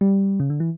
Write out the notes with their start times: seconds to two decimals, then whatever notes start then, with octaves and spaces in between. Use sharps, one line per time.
0.01 G3
0.40 C#3
0.50 D3
0.60 E3